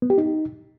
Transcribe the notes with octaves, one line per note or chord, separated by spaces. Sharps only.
B3
G4
D#4